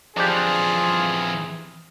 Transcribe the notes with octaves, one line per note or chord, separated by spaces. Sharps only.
F2 E3 F3 D4 F4 G4 G#4